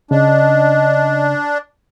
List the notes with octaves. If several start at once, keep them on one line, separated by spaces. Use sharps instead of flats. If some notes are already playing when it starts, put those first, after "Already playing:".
C#3 D4 D#5